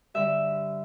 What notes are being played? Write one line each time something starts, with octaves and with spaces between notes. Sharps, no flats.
G2 D3 G3 E5